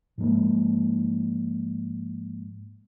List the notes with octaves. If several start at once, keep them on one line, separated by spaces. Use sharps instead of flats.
G#2 F3 G#3 A#3